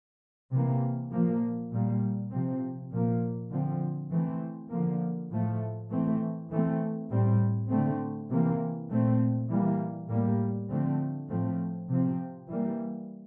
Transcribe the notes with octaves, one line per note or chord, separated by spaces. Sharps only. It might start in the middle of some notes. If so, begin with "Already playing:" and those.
C3 E3 A#3
A#2 F3 A#3
A#2 G3 A#3
C3 F3 C4
A#2 F3 A#3
D3 F3 C4
E3 A3 C4
D3 F3 A#3
A2 F3 A3
E3 A3 C4
E3 A3 C4
A2 G3 C4
D3 A3 C4
C3 E3 A#3
A#2 A3 C4
E3 G3 A#3
A2 G3 A#3
D3 F3 A3 C4
A2 F3 A3 C4
C3 F3 C4
E3 G3 A#3